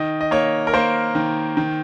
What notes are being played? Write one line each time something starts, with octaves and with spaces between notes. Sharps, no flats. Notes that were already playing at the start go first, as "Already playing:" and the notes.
Already playing: D#3 D#5
D#5
A#3 C#5
A#4
A#3 C5
D#3
D#3